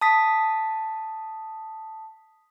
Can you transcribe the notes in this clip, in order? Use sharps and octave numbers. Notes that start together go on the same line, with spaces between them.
A5 D#6 B6